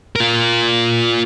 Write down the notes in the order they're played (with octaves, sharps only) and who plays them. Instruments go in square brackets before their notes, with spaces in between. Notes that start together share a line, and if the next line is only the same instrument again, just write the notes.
[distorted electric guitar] F4 A#4